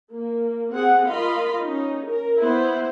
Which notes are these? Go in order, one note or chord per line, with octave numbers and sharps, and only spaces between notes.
A#3
C4 G#4 F#5
F4 A#4 D#5 F5 B5 C6
C#4 D#4
A#4
B3 E4 C5